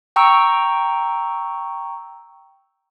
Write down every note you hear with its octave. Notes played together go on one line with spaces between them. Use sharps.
G5 A#5 C#6 E6